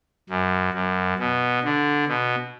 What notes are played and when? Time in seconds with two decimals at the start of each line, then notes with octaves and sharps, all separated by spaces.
0.30 F#2
0.74 F#2
1.19 B2
1.64 D3
2.08 B2